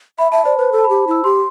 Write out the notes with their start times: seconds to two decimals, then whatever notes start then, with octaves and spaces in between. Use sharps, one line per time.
0.19 E5 B5
0.32 E5 A5
0.45 C5 D5
0.58 B4 C5
0.72 A4
0.78 A5
0.84 G4 B5
1.08 E4 E6
1.24 G4 C6